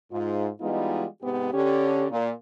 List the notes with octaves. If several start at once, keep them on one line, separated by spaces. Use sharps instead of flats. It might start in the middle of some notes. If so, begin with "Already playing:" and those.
G#2 F4
E3 G3 G#3 B3 D#4 F4
G#2 C3 B3 G4
D3 C#4 G4
A#2